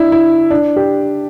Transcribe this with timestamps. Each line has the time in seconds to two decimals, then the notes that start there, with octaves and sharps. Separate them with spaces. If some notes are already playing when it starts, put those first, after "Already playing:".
Already playing: D4 E4
0.12 E4
0.50 D4
0.76 G4